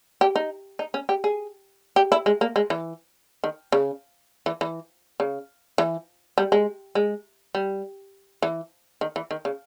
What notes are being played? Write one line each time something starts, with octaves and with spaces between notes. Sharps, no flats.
G4
D#4
D#4
C#4
G4
G#4
G4
E4
G#3
A#3
G#3
E3
D#3
C#3
E3
E3
C#3
E3
G3
G#3
G#3
G3
E3
D#3
E3
D#3
C#3